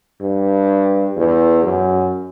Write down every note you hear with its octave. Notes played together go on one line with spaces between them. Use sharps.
G2
E2
F#2